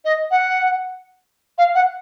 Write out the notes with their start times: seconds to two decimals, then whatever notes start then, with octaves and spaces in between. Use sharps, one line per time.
0.05 D#5
0.31 F#5
1.58 F5
1.75 F#5